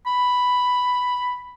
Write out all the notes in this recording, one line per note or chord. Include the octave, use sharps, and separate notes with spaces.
B5